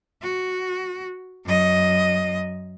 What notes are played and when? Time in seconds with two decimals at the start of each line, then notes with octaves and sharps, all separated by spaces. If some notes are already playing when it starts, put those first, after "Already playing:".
0.22 F#4
1.45 F#2 D#5